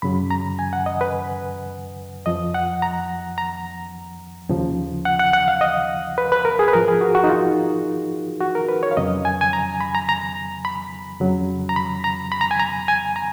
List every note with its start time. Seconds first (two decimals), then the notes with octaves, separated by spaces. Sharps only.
0.02 F#2 C#3 F#3 B5
0.31 A#5
0.59 G#5
0.73 F#5
0.86 D#5
1.01 B4
2.26 F2 F3 D#5
2.54 F#5
2.82 A#5
3.38 A#5
4.49 D#2 C#3 F3
5.05 F#5
5.19 F#5
5.33 F#5
5.48 F5
5.61 D#5
6.18 B4
6.32 B4
6.45 A#4
6.59 G#4
6.68 B4
6.73 G#2 F3 A#4
6.88 G#4
7.01 F#4
7.15 F#4
7.24 D#4
7.29 F4
8.40 F#4
8.55 A#4
8.69 B4
8.83 C#5
8.91 F5
8.97 F2 C#3 F#3 D#5
9.25 G#5
9.41 G#5
9.53 A#5
9.81 B5
9.95 A#5
10.09 A#5
10.65 B5
11.20 F2 C#3 F#3
11.69 A#5
11.76 B5
12.04 A#5
12.32 B5
12.41 A#5
12.51 G#5
12.60 A#5
12.88 G#5
13.16 A#5